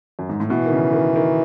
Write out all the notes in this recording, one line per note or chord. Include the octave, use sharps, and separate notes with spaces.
F#2
G#2
A2
B2 E3
D#3
C#3
D#3
D#3